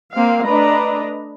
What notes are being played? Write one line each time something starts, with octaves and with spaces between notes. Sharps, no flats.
A#3 C4 F5
A3 D4 B4 D#5 A#5